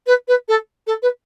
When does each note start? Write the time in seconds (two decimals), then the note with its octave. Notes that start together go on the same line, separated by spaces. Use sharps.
0.07 B4
0.28 B4
0.48 A4
0.87 A4
1.02 B4